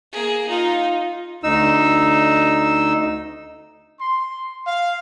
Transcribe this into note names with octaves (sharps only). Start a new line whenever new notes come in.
A#3 G#4
D#4 F4
D2 D#4 E6
C6
F5